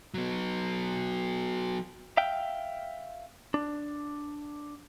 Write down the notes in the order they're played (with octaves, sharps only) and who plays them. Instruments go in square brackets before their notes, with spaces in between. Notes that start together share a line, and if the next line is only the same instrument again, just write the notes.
[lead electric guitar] F#3 B3
[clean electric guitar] E5 F5 G5
D4